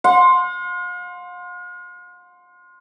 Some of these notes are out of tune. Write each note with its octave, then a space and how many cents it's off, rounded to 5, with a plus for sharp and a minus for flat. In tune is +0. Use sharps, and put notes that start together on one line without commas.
F5 +45 C6 +0